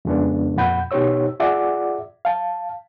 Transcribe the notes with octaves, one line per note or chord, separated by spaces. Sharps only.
F2 C#3 G#3 B3 D4
F2 A#2 F#5 B5 G6
B2 D#4 G4 C5 C#5 E6
F4 G#4 D5 E5 F#5 D6
F5 A5